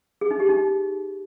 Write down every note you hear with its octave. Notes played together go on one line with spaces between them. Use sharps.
G#4
D#4
G4
D#4